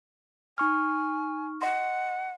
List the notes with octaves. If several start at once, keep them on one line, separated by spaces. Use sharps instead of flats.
D#4 G#5 C#6 F6
D#5 F#5 C6